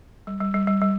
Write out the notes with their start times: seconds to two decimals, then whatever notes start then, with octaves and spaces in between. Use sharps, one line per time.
0.27 G3
0.41 G3
0.54 G3
0.67 G3
0.81 G3